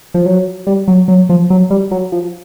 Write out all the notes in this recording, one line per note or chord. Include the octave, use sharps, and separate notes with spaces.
F3
F#3
G3
F#3
F#3
F3
F#3
G3
F#3
F3